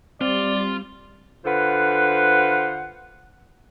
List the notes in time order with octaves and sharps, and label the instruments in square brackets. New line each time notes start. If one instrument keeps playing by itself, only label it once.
[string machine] G3 [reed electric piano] C4 [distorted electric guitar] F4 [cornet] D5
[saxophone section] D3 F4 B4 C5 F#5